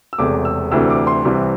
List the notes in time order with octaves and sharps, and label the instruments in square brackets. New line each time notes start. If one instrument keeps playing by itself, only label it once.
[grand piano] E6
E1 E2 C3 A3 D6
E6
D2 C3 E3 A3 D4 E6
D6
C6
C2 C3 E3 C4